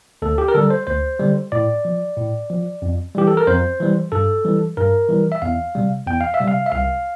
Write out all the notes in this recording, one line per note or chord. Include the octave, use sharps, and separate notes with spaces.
D2 A4
G4
A#4
D3 G3 A4
C5
D2 C5
D3 G3
A2 D5
F3
A2
F3
F2
E3 G3 G4
A4
A#4
F2 C5
E3 G3
G2 A4
E3 G3
G2 A#4
E3 G3
E5
E2 F5
C3 G3
E2 G5
F5
E5
C3 G3
F5
E5
C2 F5